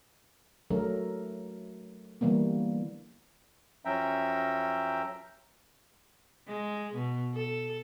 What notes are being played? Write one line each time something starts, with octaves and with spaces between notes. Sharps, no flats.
F#3 A3 D4 A4 A#4
D3 E3 G3 A#3 B3
F#2 F3 C#4 E5 G5 A#5
G#3
B2
A4